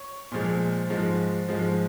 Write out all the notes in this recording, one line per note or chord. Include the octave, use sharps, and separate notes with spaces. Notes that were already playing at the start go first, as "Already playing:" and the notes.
Already playing: C#5
A#2 F3 G#3
G#2 F3 G#3
G#2 F3 G#3